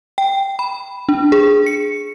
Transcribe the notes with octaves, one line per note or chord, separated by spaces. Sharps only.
G5
B5
D4
G#4
C#7